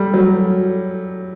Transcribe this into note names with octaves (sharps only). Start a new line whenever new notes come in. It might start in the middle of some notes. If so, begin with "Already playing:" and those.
Already playing: G3 A3
F#3